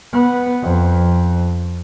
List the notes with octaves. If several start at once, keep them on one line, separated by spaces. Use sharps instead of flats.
B3
F2